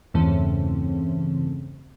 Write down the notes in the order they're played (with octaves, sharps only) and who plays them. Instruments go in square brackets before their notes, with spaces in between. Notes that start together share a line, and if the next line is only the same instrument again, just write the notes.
[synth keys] E2 G2 C#3 E3 A3 C4